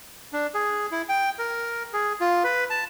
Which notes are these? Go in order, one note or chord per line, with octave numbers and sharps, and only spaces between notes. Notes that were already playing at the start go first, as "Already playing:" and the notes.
D4
G#4
E4
G5
A#4
G#4
F4
B4
A5